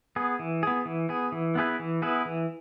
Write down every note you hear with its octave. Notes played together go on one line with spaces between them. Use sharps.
B3 G#4
E3
B3 G#4
E3
B3 G#4
E3
B3 E4 G#4 B4
E3
B3 E4 G#4 B4
E3